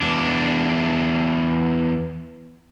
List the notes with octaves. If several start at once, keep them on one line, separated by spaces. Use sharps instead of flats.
E2 D4